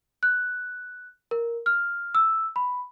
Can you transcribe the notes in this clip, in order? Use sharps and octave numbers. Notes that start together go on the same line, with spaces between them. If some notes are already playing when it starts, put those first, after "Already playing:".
F#6
A#4
F6
E6
B5